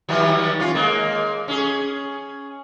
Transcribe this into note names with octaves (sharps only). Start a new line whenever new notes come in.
D#3 F#3 G3
C#4 F4
G#3 A#3
C#4 G#4